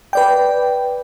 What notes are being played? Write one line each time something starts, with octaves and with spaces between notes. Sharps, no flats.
B4 D5 G5